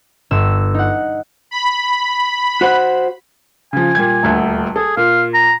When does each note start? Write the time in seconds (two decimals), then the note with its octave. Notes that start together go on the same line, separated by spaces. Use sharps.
0.31 G1 E6
0.74 D#4 F#5
1.51 B5
2.61 F#4 C5 F#5
3.73 C#3 F3 G#5
3.95 A#2 G3 G#6
4.23 D#1 D2 A3
4.76 G#4 A4
4.97 A#2 F5
5.34 A#5